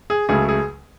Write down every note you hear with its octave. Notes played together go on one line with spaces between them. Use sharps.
G#4
C#2 C#3 F#3 A3 G#4
G#4